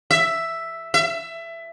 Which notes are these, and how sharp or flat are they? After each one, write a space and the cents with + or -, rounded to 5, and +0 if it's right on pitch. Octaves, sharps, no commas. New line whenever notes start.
E5 +5
E5 +20